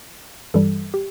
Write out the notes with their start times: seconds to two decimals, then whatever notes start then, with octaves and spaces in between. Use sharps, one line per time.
0.54 G2 E3 G3 A4
0.94 G4